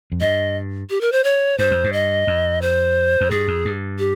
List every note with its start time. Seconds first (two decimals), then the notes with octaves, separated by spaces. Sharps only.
0.12 F2
0.21 G2 D#5
0.90 G4
1.01 A#4
1.12 C5
1.24 C#5
1.58 G2 C5
1.71 F2
1.84 G2
1.93 D#5
2.27 F2
2.62 C5
3.21 F2
3.31 G2 G#4
3.48 F2
3.65 G2
3.99 G4